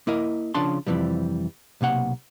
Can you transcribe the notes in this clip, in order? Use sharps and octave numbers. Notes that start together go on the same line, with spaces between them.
A#3 E4 A#4 D#5
C#3 F3 D4 A5 C6
F2 C3 E3 F3 G3
B1 C3 A#3 F#5